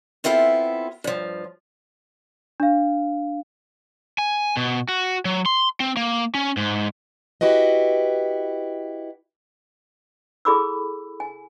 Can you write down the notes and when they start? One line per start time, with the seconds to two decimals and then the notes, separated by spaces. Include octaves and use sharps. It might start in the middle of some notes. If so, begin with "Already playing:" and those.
0.24 B3 C4 E4 F4 A4
1.04 G2 F3
2.60 D4 F5
4.18 G#5
4.57 B2
4.88 F#4
5.25 F#3
5.46 C6
5.80 C4
5.97 A#3
6.35 C#4
6.57 G#2
7.41 E4 F#4 G4 B4 D#5
10.45 E4 G#4 A4 B5 D6 E6
11.20 G#5